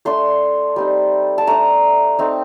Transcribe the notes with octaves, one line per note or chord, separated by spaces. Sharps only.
A3 D4 C6
G3 C4 D#4
A5
A3 D4 A#5
A3 C4 D#4